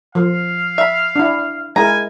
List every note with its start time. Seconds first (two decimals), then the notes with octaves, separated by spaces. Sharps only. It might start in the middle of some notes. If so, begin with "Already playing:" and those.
0.15 F3 F5
0.78 E5 B5
1.16 D4 E4
1.76 G#3 E4 A#4 G#5 A#5